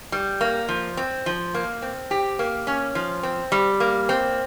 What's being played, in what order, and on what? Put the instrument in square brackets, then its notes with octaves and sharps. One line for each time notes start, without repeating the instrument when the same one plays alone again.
[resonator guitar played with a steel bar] G3
A#3
F3
C4
F3
A#3
C4
G4
A#3
C#4
F3
C4
G3
A#3
C4